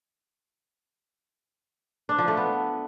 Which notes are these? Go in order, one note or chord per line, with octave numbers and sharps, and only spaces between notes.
D4
F3
A3
B3